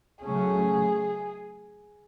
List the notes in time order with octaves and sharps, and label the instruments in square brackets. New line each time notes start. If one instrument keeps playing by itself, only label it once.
[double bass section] C#3 F#3 A3 C#4 [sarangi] G#4